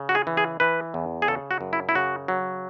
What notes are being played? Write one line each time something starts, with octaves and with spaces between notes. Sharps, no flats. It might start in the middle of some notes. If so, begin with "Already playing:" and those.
Already playing: C#3
F#4
G#4
E3
G#4
E3 B4
E2
G#4
C#3 A4
F#4
F#2
E4
E4
C#3 F#4
F#3